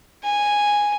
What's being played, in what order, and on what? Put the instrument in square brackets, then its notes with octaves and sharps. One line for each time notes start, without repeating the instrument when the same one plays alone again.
[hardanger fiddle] G#5